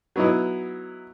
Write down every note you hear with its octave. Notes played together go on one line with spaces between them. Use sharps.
F#3 B3 D#4 E4 D#5